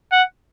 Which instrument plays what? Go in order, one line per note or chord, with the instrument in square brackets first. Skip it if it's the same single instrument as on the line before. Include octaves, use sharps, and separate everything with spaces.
[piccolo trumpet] F#5